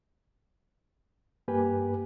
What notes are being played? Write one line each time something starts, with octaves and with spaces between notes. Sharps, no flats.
G2 A#3 G4 B4 G#5